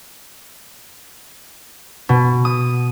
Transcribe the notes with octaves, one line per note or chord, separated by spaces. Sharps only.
B2
D#6